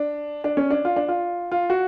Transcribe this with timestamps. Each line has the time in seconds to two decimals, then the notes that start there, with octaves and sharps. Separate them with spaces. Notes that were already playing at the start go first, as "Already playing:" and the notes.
Already playing: D4
0.44 D4
0.57 C#4
0.71 D4
0.85 F4
0.96 D4
1.08 F4
1.52 F4
1.70 F#4